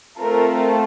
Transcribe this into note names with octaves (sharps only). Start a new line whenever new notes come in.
A3 C4 F4 A4 A#4